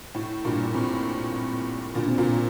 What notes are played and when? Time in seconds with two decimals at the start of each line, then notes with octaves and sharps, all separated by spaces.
0.14 A2
0.45 G2 A#2
0.74 A2 C3
1.95 A#2 D3
2.07 C3
2.18 A#2 D3